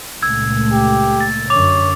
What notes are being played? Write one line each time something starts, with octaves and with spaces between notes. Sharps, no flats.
C#2 A#2 A3 E6 G#6
G4
A6
F#2 D3 C#5 D6 F7